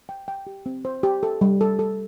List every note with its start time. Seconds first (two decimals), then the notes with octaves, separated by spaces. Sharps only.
0.09 G5
0.28 G5
0.47 G4
0.66 C4
0.85 C5
1.03 G4
1.23 A4
1.41 G3
1.61 A4
1.79 A4